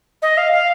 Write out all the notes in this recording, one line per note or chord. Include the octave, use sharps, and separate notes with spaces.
D#5
F5
F5